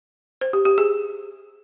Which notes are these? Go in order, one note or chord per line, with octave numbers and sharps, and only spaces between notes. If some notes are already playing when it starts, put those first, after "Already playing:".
C5
G4
G4
G#4